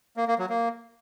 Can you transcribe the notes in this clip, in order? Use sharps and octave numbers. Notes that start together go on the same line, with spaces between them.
A#3
A#3
F#3
A#3